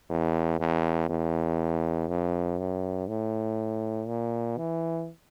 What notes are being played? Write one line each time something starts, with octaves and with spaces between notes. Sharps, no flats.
E2
E2
E2
F2
F#2
A2
A#2
E3